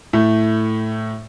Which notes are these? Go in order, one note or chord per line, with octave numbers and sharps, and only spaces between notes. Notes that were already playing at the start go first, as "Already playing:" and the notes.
A2 A3